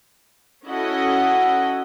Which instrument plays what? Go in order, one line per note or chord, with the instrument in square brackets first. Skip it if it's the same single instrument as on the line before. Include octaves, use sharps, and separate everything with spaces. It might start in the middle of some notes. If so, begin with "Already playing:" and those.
[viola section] C#4 E4 F#4 A4 D#5 F#5